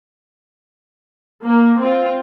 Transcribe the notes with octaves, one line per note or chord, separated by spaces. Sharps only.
A#3
C4 F4